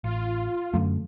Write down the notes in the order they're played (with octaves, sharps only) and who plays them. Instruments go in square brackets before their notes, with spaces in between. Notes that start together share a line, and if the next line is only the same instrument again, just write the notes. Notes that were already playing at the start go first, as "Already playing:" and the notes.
[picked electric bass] A1 [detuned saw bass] F4
[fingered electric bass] F#2 [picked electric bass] D3 F#3 A3